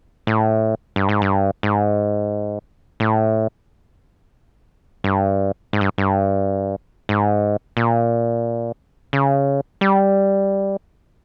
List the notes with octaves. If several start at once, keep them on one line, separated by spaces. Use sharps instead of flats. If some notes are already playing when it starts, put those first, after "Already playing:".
A2
G2
G#2
G2
G#2
A2
G2
G#2
G2
G2
G#2
A#2
C#3
G3